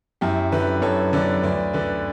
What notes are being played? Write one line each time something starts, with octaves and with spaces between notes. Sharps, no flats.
F#2 E4 G4
D3 G4 B4
F#2 A4 C#5
D3 B4 D5
D2 B4 D5
D3 B4 D5